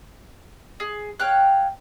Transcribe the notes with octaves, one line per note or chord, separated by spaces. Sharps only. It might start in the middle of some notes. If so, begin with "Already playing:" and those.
G#4
C#5 F5 G5 F#6